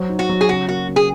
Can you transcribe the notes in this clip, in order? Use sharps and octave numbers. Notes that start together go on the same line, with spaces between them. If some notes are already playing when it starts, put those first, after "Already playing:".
Already playing: F#3 C5
D#4
F#4
F#3
G#4
C#3 F#4
A#3 F#4
C#3
G#4